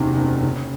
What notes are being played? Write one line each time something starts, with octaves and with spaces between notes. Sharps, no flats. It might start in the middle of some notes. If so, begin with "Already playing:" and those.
Already playing: F#1 E2 C3 D#3
F#1
C#3